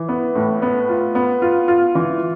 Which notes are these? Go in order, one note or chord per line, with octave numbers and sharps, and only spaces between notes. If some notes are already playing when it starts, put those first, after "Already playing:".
Already playing: E3
B3
A2
B3
F4
B3
F4
F4
E3